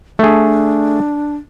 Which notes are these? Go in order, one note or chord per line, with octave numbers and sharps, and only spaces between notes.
A3 D4 G#4